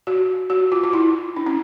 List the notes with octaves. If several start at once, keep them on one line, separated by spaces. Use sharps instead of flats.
F#4
F#4
F4
F4
E4
D4
C#4